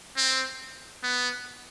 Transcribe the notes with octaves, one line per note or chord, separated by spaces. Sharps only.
C4
B3